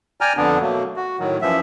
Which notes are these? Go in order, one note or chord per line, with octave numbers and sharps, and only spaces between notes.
D5 G5 G#5 A#5 F6
F2 D3 B3 D4
B2 F#3 A3 A#3
F#4
A2 D#3 F#3
F#2 E3 F3 E5